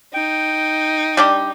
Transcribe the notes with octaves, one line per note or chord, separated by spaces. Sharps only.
D#4 G5
G3 D4 G4